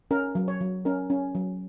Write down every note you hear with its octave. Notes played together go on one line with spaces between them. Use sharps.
C#4 A#4
F#3
C#5
F#3
C#4 A#4
C#4
F#3